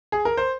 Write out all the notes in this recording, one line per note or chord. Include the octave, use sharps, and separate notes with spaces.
G#4
A#4
C5